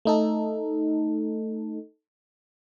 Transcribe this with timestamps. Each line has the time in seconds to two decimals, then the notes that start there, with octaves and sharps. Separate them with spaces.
0.05 A3 D#4 A4